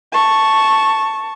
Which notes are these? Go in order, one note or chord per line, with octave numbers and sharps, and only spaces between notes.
A5 C#6